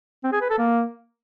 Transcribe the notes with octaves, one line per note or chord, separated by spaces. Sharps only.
C4
G#4
B4
A4
A#3